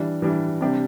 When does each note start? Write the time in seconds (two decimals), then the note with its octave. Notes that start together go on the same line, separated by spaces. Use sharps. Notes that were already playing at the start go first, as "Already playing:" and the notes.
Already playing: E3 G3 D4
0.22 E3 G3 D4
0.61 C3 G3 D4 G4